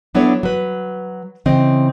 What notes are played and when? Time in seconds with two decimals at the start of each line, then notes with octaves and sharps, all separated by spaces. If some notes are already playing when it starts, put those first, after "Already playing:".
0.15 F#3 B3 D4 E4 A4 C#5
0.43 F#3 B4
1.46 C#3 E3 C4 D#5